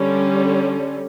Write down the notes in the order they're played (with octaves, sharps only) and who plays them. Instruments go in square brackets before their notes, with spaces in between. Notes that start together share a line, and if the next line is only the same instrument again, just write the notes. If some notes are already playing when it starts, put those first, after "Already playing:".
Already playing: [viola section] D3 G3 C#4